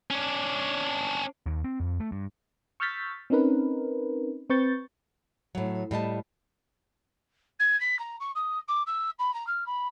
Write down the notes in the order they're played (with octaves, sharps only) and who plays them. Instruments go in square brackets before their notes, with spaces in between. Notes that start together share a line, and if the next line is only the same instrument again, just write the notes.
[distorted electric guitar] C#4 D4
[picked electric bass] D#2
C4
F2
A3
G2
[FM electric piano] C#6 E6 F6 G6 A6 B6
C4 C#4 D#4 A#4 B4
C4 B4 C#6 G6 A6
[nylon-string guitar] A2 F#3
A2 G3 D#5 A5
[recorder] G#6
B6
A#5
C#6
D#6
D6
E6
B5
A#5
F6
B5